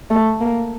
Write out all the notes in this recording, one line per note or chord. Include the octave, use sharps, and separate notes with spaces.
A3
A#3